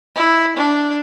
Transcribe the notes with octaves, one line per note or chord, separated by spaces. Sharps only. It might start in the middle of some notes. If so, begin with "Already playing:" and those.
E4
D4